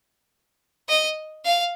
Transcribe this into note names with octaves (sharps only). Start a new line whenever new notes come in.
D#5
F5